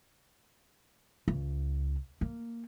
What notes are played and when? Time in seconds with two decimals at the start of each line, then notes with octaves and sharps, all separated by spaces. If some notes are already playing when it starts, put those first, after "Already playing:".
1.28 C#2
2.21 A#3